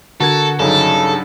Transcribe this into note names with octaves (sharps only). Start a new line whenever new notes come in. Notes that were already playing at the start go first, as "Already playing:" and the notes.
D3 F#4 A4 A#4 G#6
G2 C#3 F#3 D#4 A4